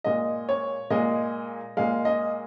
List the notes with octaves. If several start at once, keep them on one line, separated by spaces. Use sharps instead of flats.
A#2 G#3 D#5
C#5
A#2 G#3 D#5
A#2 G#3 F5
D#5